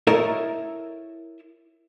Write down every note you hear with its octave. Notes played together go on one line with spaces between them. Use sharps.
E4 A4 A#4 C#5 D#5 E5